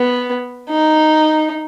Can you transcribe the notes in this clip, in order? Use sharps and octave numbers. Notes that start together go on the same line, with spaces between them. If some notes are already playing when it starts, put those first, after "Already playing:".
Already playing: B3
D#4